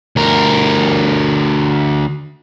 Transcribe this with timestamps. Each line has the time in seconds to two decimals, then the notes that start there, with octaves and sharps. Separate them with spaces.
0.16 D2 A#4